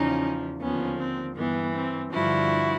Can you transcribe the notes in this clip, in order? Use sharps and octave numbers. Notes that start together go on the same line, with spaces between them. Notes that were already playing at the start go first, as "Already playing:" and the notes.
Already playing: E2 C#3 F3 C#4 D#4
D#2 D3 F3 B3 C#4
C4
G2 E3 B3
C4
G2 D3 F3 E4 F#4